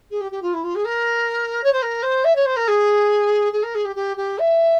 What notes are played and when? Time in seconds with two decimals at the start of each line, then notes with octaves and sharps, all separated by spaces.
0.11 G#4
0.20 G4
0.31 G4
0.42 F4
0.54 E4
0.63 F4
0.75 G#4
0.85 A#4
1.63 C#5
1.73 C5
1.82 A#4
2.02 C5
2.24 E5
2.35 C#5
2.45 C5
2.56 A#4
2.68 G#4
3.52 G#4
3.63 A#4
3.75 G#4
3.85 G4
3.96 G4
4.17 G4
4.38 E5